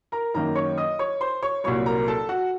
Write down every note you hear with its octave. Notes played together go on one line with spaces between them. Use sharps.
A#4 A#5
F#2 D#3 A#3 A#4 A#5
C#5 C#6
D#5 D#6
C#5 C#6
C5 C6
C#5 C#6
C2 A#2 F#3 C#5 C#6
A#4 A#5
A4 A5
F#4 F#5